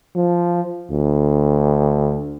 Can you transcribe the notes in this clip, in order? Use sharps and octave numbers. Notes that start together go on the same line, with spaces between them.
F3
D2